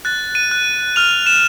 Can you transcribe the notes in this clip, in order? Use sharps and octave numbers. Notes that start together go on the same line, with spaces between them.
F#6 A6
D#7
F#6
F6 F7
E7